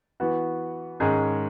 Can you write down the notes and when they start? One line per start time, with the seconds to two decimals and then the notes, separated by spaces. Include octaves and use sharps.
0.20 E3 B3 F#4
1.00 G#2 D#3 G#3 C#4 G#4